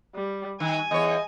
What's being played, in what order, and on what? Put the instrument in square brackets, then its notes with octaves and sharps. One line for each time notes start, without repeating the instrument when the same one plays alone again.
[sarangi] G3
[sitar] D#3 [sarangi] G#5
[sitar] E2 C#5 [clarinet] D#5